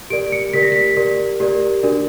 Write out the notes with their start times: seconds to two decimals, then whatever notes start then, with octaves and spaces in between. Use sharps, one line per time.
0.10 G4 A#4 D5 D7
0.32 C#7
0.53 G4 A#4 D5 B6
0.63 A#6
0.72 B6
0.97 G4 A#4 D5
1.40 G4 A#4 D5
1.83 D4 F#4 A#4 D5